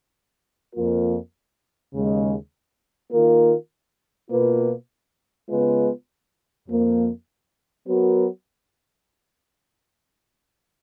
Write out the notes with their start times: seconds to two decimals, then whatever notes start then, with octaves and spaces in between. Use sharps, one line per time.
0.75 F2 F3 A#3 F4 A#4
1.94 D#2 C#3 G#3
3.11 D#3 A#3 F4 A#4
4.31 B2 A#3 F4 B4
5.49 C#3 G#3 B3 F4 B4
6.68 F2 F3 A#3
7.86 F#3 B3 F#4 A#4